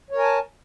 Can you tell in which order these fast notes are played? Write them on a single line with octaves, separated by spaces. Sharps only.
C#5 A#4 G#5 A5